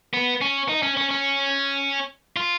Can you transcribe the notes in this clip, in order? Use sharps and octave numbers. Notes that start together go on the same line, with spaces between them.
B3
C#4
D#4
C#4
C#4
C#4
F4